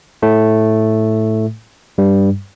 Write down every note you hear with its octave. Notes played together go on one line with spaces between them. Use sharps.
A2 A3
G2 G3